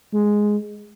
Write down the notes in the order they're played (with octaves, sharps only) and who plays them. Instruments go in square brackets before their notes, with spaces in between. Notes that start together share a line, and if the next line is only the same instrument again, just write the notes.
[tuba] G#3